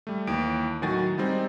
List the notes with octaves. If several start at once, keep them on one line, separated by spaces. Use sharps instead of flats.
G3 A3
D#2 E3 D7
A2 D#3 F#3 F#4 G#5 A6
G3 G#3 C4 D#4